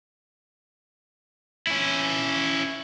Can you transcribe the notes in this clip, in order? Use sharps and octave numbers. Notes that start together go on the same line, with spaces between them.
C#4 E4